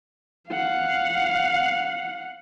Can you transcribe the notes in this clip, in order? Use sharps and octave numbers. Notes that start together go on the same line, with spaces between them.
F5 F#5